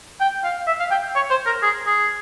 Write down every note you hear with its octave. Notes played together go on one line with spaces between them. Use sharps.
G5
F5
E5
F5
G5
C#5
C5
A#4
G#4
G#4